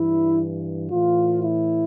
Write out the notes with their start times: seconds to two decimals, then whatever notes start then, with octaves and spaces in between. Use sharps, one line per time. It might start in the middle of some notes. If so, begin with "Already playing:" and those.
Already playing: G2 E3 E4
0.91 A2 E3 F4
1.44 E4